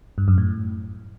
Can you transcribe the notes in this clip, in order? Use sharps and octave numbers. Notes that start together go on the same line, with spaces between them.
G2
F#2
A2